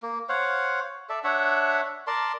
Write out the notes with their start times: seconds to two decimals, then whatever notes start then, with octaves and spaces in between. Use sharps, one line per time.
0.03 A#3
0.29 C5 C#5 F5 F#5
1.09 A4 D5 E5
1.24 D4 C#5 E5 F#5
2.07 A#4 D5 A5 C6